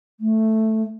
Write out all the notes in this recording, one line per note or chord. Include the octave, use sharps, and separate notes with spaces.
A3